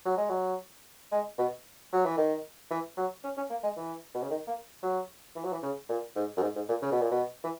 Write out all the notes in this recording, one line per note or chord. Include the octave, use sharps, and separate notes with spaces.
F#3
G#3
F#3
G#3
B2
F#3
E3
D#3
E3
F#3
C#4
C#4
A#3
G#3
E3
B2
C#3
D#3
A#3
F#3
E3
F#3
E3
C#3
A#2
G#2
F#2
G#2
G#2
A#2
C#3
B2
A#2
B2
E3